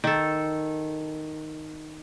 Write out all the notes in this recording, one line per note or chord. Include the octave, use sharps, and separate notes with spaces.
D#3 A4